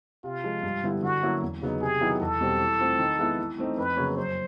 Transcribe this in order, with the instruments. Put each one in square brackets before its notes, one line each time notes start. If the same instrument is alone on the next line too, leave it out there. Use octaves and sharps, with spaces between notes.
[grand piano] C3 [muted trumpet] F4
[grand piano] F3 G#3
G2
D3 G3 B3 E4
[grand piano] D3 [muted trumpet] F#4
[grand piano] F#3 A#3 C#4 E4
E2
C#3 F#3 B3 D#4
[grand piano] C3 [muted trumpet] G#4
[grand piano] D#3 F#3 B3 E4
[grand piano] E2 [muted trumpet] A4
[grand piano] B2 G3 C4
E3
A3 C4 F4
D#3
G#3 B3 E4
E3
A3 C4 D#4
[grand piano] F2 [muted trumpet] B4
[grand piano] C#3 F#3 A#3 C#4
[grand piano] F#2 [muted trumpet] C5